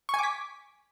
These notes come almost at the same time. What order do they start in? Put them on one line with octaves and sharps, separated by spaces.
C#6 G#5 D6 B6